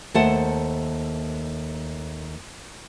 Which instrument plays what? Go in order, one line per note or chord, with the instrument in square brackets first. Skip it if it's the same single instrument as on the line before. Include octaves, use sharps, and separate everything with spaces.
[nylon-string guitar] D#2 A3 C5 F#5 A5